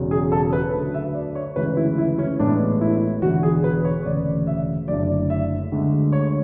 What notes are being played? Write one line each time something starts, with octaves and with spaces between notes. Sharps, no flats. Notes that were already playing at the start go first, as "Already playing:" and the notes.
Already playing: E1 E2 C#3 F#3
G#4
A4
B4
D2 D3 F#3 A3
E5
D5
C#5
D2 C#3 E3 G#3 B4
E4
E4
C#4
A1 A2 G#3 B3 D4
E4
E1 E2 D3 F#4
G#4
B4
C#5
E1 D2 C#3 D5
E5
F#1 F#2 D3 A3 D5
E5
D2 D3 G#3
C#5